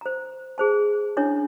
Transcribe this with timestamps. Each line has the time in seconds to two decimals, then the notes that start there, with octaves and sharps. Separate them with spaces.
0.01 C5 A#5
0.58 G#4 C5 A5
1.17 C#4 D4 E4 C#5